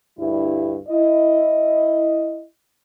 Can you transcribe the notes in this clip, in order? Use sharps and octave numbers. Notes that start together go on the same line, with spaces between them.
D2 G2 G3 E4
E4 D#5